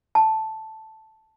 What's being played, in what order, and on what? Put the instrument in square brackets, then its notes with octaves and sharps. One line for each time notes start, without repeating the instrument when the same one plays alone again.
[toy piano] A5